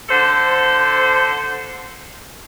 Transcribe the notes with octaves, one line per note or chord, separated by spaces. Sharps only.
D3 A4 C5